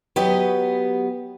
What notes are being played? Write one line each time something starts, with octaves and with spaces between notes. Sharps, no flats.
F#3 B3 G4 D#5